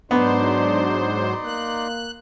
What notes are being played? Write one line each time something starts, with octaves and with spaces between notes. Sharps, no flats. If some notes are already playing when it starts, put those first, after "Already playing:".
G#2 F#3 B3 D4 D#4 C5 D5 C6
A#3 F#6